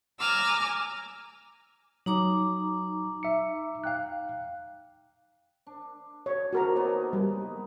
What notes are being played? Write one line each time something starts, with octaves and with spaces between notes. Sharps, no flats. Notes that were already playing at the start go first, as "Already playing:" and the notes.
G#5 A#5 D6 E6 F6
F#3 D#4 A#5 D6
E5 C#7
F5 G5 F#6
D4
C#5
D#3 C4 D4 F#4 A#4 A#5
A#3 B3 D#4 C#5
G3 G#3